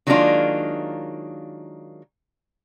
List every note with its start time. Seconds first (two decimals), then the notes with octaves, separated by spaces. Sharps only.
0.07 D#3 F#3 G#3 A#3 D4 F4